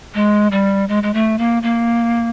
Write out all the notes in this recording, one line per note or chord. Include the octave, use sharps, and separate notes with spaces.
G#3
G3
G#3
G#3
A3
A#3
A#3